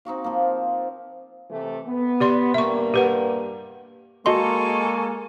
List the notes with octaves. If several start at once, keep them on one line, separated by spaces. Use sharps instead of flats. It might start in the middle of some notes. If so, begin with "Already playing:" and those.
C4 D#4 F#4 F5
F3 A#3
C3 E3 A3
B3
G4 D5 C6
G2 G3 A#3 E5 C#6
G4 B4 F#5
G#3 A#3 F#4 A4 D#5 G#5 C6 C#6